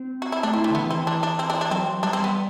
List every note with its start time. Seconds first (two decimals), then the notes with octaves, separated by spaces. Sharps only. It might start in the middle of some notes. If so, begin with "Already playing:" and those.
Already playing: C4
0.22 F#4
0.32 E4
0.43 A3 D4
0.53 C4 E4
0.64 A3 D4
0.71 D3
0.75 E3 B3
0.86 E3
0.91 C4
0.97 E3
1.07 E3 D4
1.23 D4
1.39 C4
1.50 D4
1.61 D4
1.71 F#3 C4
2.03 G3 D4
2.13 C4
2.24 B3